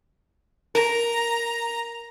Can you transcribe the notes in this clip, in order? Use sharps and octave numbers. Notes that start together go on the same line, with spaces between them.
A#4 A#5